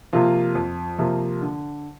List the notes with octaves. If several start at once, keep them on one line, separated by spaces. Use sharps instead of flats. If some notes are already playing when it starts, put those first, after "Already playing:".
C3 F3 A#3 F4
F2
C3 F3 A#3 F4
D3